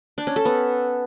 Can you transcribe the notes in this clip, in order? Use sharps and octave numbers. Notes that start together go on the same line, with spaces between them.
D4
C#4
A4
B3